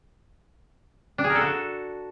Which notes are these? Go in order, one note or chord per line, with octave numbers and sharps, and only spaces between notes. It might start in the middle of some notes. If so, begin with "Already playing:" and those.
D4
G#4
A#4
A4
F#4